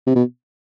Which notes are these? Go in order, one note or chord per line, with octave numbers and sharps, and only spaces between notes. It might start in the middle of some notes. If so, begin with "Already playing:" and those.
C3
B2